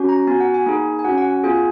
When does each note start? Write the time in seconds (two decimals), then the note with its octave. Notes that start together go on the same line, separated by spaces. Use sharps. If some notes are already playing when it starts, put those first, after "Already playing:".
Already playing: C#4 F#4
0.09 A#5
0.27 B3 F#4 G#5
0.41 F#5
0.54 G#5
0.66 A#3 D#4 G#4
0.99 G#5
1.05 C#4 F#4 F#5
1.18 F#5
1.30 F#5
1.44 B3 F4 G#4 G#5